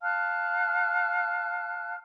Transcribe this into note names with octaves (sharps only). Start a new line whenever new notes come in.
F5 A5 F6 F#6